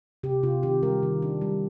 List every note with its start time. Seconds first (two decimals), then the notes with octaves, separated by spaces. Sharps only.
0.23 C3 G4
0.43 C3 F4
0.63 D#3 G4
0.83 G3 A#4
1.03 D#3
1.22 D4
1.41 G3